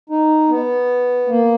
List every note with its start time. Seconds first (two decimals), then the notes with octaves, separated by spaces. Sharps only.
0.09 D#4
0.49 B3
1.27 A#3